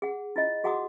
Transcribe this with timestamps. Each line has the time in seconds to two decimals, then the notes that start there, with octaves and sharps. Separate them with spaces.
0.02 G#4 F#5
0.36 E4 F4 D#5
0.64 F#4 G#4 F#5 A#5 D6 D#6